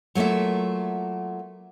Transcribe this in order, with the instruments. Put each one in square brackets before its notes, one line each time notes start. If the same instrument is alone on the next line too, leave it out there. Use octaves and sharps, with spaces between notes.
[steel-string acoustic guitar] F#3 A3 A#3 F4 E5